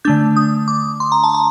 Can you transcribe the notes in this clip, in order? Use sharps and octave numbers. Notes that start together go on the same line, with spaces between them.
D3 A3 D4 G6
D#6
D6
C6
A#5
A5
A#5